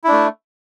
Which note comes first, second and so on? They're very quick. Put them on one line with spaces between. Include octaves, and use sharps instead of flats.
E4 D4 A3